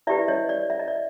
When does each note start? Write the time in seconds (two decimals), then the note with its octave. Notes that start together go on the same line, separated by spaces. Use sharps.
0.07 E4 G4 B4 D5 E5
0.28 C#5 D#5
0.49 D5
0.70 E5
0.79 D#5
0.88 D5